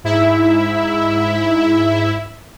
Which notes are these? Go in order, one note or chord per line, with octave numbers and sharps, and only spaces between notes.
G#2 E4 E5